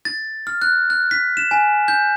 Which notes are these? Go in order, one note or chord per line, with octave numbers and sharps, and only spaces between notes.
A6
F6
F#6
F#6
B6
E7
G#5
G6